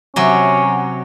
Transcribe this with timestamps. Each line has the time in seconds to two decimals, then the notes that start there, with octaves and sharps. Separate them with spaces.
0.16 C3 F#3 C#4